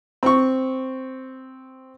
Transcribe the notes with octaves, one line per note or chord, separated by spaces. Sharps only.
C4 C#6